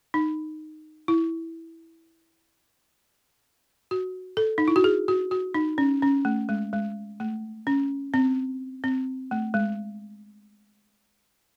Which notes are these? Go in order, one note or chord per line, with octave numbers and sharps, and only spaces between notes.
D#4
E4
F#4
A4
D#4
E4
F#4
G#4
F#4
F#4
D#4
C#4
C#4
A3
G#3
G#3
A3
C#4
C4
C4
A3
G#3